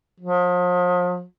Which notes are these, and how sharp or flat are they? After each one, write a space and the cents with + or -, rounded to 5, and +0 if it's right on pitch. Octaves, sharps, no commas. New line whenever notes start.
F3 +40